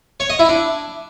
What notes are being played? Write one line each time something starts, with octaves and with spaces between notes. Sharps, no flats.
C#5
D#5
E4
D4